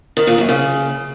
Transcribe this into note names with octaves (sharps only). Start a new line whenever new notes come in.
D#3
A#2
F#2
C#3